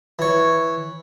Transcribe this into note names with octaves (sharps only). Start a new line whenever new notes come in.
E3 C#5